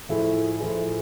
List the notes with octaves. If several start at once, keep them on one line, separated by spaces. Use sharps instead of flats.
A2 F3 A3 E4 G#4
A2 F3 A3 E4 G#4